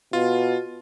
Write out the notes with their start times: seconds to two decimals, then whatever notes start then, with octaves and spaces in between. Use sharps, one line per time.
0.13 B2 F4